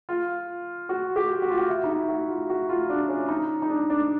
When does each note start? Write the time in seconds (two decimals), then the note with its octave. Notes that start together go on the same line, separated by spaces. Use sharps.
0.09 F4
0.89 F#4
1.16 G4
1.42 F#4
1.50 F4
1.57 F#4
1.69 E4
1.84 D#4
1.89 E4
2.08 F#4
2.29 F4
2.49 F#4
2.69 F4
2.89 D4
3.09 C#4
3.29 D#4
3.62 D#4
3.69 D4
3.90 D4